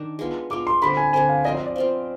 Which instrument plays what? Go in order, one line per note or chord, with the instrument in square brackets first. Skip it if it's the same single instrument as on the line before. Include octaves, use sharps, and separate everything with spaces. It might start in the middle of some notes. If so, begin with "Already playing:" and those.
Already playing: [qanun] D#3 D4
G#3 B3 F4
[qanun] G#3 B3 F4 [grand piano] D6
[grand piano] C6
[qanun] D3 G3 C4 [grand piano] B5
[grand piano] G#5
[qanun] D3 G3 C4 [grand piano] G#5
[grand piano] F5
[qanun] F3 C4 F4 [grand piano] D#5
[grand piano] D#5
D5
[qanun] F3 C4 F4